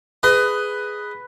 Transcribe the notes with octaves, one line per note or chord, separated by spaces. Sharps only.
G#4 B4 D#5 D#6